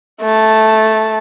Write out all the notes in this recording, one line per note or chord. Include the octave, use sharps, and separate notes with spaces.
A3 A5